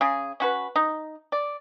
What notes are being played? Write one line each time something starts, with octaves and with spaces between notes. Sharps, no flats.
C#3 G#4
C#4 F#4 B4
D#4
D5